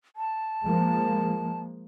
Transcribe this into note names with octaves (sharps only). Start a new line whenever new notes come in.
A5
F3 G#3 A#3